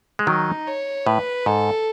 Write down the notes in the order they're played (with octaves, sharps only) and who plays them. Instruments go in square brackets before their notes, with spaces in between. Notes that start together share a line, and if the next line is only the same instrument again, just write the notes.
[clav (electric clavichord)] G#3
[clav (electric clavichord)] D#3 F#3 [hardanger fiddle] D#4
[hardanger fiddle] C#5
[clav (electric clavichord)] A2 [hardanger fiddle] B4
[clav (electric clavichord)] G#2 [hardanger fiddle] A4